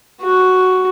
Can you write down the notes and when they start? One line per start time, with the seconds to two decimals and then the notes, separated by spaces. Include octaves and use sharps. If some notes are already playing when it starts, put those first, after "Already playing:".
0.22 F#4